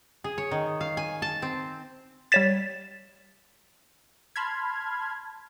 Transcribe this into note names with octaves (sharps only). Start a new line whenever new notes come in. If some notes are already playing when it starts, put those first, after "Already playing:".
G#4
C#5
D#3
F5
G#5
A5
C4
G3 C#5 A6 B6 E7
A5 B5 C6 F6 G#6